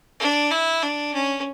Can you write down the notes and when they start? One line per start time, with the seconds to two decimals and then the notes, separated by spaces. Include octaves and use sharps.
0.20 D4
0.51 E4
0.83 D4
1.14 C#4